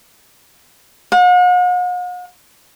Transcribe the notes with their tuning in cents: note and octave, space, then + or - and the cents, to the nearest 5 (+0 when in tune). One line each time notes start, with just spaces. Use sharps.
F#5 -45